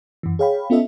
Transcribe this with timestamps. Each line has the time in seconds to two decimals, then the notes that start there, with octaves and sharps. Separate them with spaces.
0.23 F#2 E3
0.39 G#4 C#5 F5 G5 B5
0.70 B3 C#4 F4 A4 D#5 E5